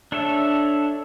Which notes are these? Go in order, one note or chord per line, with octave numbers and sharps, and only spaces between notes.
D4 A4 C#5 E5